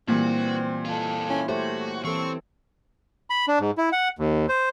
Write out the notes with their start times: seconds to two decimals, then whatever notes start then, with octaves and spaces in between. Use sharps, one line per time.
0.08 A#2 E3 G3 C4 F#4
0.85 F4 A4
1.30 C#4 E4
1.49 A3 F#4 G4 C5 C#5
2.05 E3 C4 A4 C#6
3.30 B5
3.48 D4
3.60 G#2
3.78 E4
3.92 F#5
4.19 D#2
4.49 C5